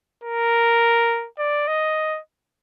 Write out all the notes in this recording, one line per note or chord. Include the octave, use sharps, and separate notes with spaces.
A#4
D5
D#5